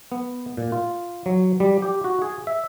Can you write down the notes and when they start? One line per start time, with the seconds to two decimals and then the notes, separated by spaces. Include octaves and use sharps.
0.12 B3
0.57 A#2
0.72 F4
1.26 F#3
1.60 G3
1.82 G4
2.04 F#4
2.22 G#4
2.47 E5